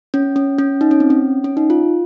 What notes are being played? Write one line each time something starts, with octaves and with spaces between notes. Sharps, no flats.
C#4
C#4
C#4
D#4
C#4
C4
C#4
C#4
D#4
F4